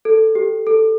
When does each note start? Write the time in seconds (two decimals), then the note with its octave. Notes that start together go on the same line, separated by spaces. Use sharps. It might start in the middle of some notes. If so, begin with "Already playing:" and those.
0.05 A4
0.35 G4
0.67 A4